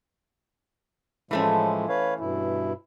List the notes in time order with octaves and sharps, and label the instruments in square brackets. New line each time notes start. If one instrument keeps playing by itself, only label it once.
[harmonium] A2 F3 G#3 [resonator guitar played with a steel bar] E3 A3 C#4
[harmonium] B4 C#5 F5
G2 B2 E4